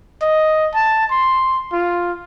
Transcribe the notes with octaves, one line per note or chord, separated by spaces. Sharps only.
D#5
A5
C6
F4